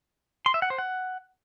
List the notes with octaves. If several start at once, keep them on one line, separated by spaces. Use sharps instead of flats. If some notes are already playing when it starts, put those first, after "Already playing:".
C6
E5
F#5
C5
F#5